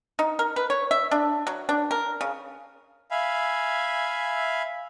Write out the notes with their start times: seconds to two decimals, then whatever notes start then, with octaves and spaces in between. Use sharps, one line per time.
0.19 D#4
0.39 A#4
0.56 B4
0.70 C#5
0.91 E5
1.11 D4
1.47 F#3
1.69 D4
1.91 A#4
2.21 C#3
3.11 E5 F5 G#5 B5